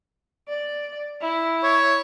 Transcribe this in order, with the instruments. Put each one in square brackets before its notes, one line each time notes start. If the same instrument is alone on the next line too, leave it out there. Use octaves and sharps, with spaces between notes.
[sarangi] D5
E4
[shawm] C#5